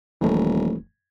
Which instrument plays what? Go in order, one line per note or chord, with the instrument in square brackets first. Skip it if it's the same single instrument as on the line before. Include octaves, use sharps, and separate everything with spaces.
[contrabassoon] D#1 [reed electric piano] E3 F3 A3